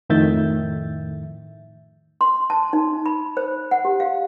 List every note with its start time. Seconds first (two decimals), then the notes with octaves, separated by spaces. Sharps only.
0.10 F2 A2 D#3 E5 G6 A6
2.21 C6
2.50 A5
2.73 D#4
3.06 B5
3.37 C5
3.71 F#5
3.85 G4
4.00 F5